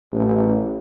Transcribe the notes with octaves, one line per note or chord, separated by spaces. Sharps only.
A1